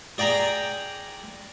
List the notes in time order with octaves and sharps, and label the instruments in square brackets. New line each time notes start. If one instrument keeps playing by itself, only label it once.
[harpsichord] G#4 D5 G5 A#5